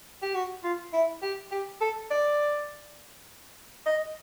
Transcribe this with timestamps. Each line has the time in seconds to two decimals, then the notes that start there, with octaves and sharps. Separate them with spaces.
0.22 G4
0.35 F#4
0.64 F4
0.93 E4
1.22 G4
1.52 G4
1.81 A4
2.11 D5
3.86 D#5